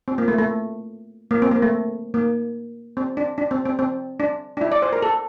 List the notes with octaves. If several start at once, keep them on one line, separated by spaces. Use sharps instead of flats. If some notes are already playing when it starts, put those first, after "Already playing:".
C4
A#3
A3
A3
A#3
C4
A#3
A3
A#3
C4
D4
D4
C4
C4
C4
D4
D4
E4
D5
C5
A#4
A4